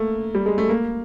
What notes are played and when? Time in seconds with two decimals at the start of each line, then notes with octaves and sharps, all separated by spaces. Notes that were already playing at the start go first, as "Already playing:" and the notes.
Already playing: A3 A#3
0.35 G3
0.46 G#3
0.58 A3
0.69 A#3